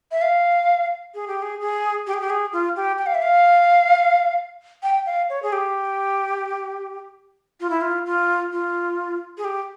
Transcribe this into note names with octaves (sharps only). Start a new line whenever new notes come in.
E5
F5
G#4
G4
G#4
G#4
G4
G#4
G4
G#4
F4
G4
G5
F5
E5
F5
G5
F5
C#5
G#4
G4
F4
E4
F4
F4
F4
G#4
G4